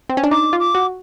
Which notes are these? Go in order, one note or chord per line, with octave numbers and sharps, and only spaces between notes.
C4
C#4
D4
D#4 D6
F4
D6
F#4